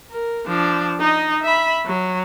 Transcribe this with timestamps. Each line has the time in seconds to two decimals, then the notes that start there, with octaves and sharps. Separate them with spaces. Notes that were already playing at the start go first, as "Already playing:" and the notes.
0.11 A#4
0.47 F3 D4
1.00 D#4 D#5
1.43 E5 B5
1.86 F#3